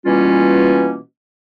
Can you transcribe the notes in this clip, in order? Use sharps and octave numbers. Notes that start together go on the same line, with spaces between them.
B2 E3 G3 A#3 C#4 F4